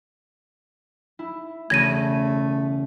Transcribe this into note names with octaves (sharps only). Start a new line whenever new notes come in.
E4
E1 C#3 A3 C#4 G#6 A#6 D#7